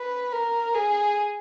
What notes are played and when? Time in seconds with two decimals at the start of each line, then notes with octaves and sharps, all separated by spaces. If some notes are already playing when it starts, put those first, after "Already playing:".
Already playing: B4
0.33 A#4
0.74 G#4